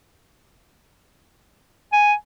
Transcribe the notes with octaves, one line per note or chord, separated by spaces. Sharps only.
G#5